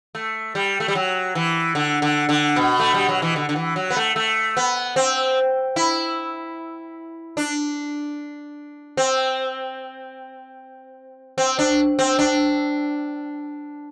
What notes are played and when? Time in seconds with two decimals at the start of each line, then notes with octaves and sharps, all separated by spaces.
0.15 A3
0.55 G3
0.80 A3
0.88 G3
0.95 F#3
1.35 E3
1.75 D3
2.02 D3
2.29 D3
2.56 B2
2.80 A3
2.94 G3
3.09 F#3
3.22 E3
3.36 D3
3.49 D3
3.56 E3
3.76 F#3
3.90 B3
3.96 A3
4.16 A3
4.57 B3
4.96 C4
5.76 E4
7.37 D4
8.97 C4
11.38 C4
11.59 D4
11.99 C4
12.19 D4